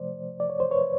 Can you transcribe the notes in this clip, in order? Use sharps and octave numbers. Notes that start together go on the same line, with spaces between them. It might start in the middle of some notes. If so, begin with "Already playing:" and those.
Already playing: C3 F3 A3 C5 D5
D5
C#5
C5
B4 C#5